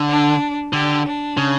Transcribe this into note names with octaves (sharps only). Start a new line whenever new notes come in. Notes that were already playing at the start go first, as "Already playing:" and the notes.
Already playing: D3
D4
D3 G4
D4
C#3